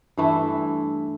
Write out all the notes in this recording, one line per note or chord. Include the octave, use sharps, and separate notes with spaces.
G2 E3 A3 E4